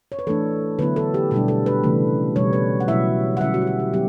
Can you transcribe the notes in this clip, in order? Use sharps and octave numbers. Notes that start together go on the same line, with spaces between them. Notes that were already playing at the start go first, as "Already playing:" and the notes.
C#5
B4
E3 A3 D4 A4
D3 F#3 B3 E4 B4
A4
G4
B2 G3 D4 G4
A4
B4
C#3 E3 A3
B2 G3 C#4 C#5
B4
F#5
B2 F#3 A3 E4 E5
F#5
D3 G3 C#4 E4 E5
F#4
G4
F#4
G4
F#3 B3 G4